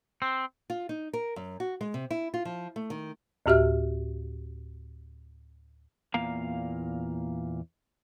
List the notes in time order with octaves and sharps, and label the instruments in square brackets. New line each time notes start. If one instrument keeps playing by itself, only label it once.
[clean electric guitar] C4
[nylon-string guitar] F4
D#4
A#4
F#2
F#4
G#3
C3
E4
F4
F3
A3
D#3
[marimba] D2 A2 F#4 G4 E5 F6
[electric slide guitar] E2 A#2 A#3 F5 A#5